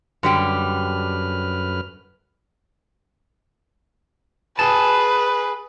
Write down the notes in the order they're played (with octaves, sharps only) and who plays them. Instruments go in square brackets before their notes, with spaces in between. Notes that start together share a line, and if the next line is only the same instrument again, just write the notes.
[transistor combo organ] F#2 B4 F6 [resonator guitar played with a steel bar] D3 G3 G4
[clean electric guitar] G#4 A5 [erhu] B4